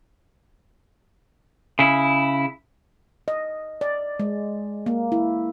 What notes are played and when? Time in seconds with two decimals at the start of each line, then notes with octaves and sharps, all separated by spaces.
1.79 C#3 E4
3.28 D#5
3.81 D5
4.20 G#3
4.86 A#3
5.12 E4